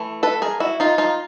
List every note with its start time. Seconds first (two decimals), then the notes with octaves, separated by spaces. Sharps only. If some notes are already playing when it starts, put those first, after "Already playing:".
Already playing: E3 A3
0.23 A4 B4
0.42 G#4 A#4
0.60 E4 F#4
0.80 D#4 F4
0.98 D#4 F4